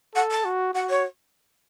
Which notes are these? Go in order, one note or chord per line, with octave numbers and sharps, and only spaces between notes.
A4 F#5
A5
F#4
F#4 F#5
C#5